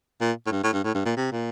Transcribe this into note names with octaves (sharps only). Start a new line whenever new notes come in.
A#2
A2
G2
A2
G2
A2
G2
A#2
C3
A#2